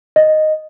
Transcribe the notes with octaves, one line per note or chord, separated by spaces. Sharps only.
D#5